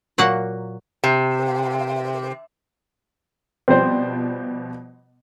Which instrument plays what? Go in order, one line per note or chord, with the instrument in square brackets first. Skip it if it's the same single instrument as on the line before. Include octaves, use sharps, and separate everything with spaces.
[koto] A#2 F#3 A#3 F#5
[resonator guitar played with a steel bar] C3
[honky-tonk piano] B2 F3 G3 [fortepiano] C4 C5